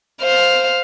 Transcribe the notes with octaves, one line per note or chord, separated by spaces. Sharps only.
C5 F5